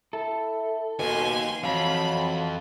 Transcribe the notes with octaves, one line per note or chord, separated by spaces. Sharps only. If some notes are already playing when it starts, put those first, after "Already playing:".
E4 A4
D#2 B2 G#5 C6
F2 E3 F#3 F5 B5